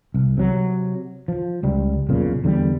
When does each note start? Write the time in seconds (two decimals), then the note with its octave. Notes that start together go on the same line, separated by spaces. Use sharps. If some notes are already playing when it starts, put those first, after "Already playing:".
0.14 C2
0.37 C3 F#3
1.28 F3
1.63 C#2 G3
2.09 B1 F2 A#2 C#3
2.44 E2 D3 E3 G3